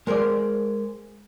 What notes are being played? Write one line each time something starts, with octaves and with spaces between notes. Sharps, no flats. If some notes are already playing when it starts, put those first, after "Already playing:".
G#3 A#4 C5 D5